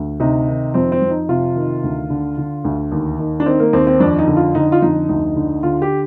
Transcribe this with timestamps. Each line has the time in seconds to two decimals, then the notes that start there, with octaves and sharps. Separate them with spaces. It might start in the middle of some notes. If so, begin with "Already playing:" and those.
Already playing: D2
0.20 C3 D#4
0.48 D#3
0.74 F2 C4
0.92 C4
1.02 F2
1.10 D#4
1.29 C3 F4
1.56 D#3
1.83 D2
2.10 D3
2.38 D3
2.64 D2
2.92 D#2
3.19 D#3
3.40 D4
3.46 D#3 C4
3.60 A#3
3.73 D#2 C4
3.87 C4
4.00 F2 D4
4.19 D#4
4.28 D3
4.36 F4
4.55 D3 D#4
4.72 F4
4.82 F2 D#4
5.09 D2 D#4
5.36 D3
5.63 D3 F4
5.82 G4